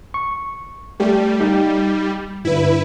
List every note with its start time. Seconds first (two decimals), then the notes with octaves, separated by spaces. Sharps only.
0.14 C#6
1.00 G3 A3 G4
1.40 D#4 G4
2.45 G2 D3 E4 B4